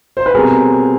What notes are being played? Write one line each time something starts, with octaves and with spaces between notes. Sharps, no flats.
C5
B4
B2 G3 C4 G#4 A#4